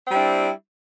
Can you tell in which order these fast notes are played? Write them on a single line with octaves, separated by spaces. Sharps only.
C4 G3 E4 D4